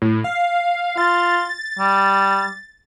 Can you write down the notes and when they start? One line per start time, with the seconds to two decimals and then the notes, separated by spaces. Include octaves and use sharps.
0.02 A2
0.24 F5
0.97 F4 A6
1.79 G3